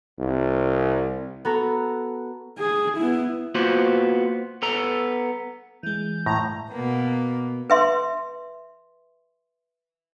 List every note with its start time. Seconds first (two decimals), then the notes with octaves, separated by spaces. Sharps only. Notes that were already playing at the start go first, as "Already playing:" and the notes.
0.19 C2
1.45 B3 F#4 A4 A#5
2.58 G#4
2.97 B3 E4
3.55 A#3 B3 F4 F#4 C5
4.62 B3 A4 A#5
5.83 E3 G#3 G6
6.26 A2 A#5
6.71 B2 A#3 B3
7.70 B4 E5 C6